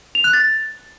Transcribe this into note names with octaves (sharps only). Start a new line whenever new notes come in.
F7
F#6
A6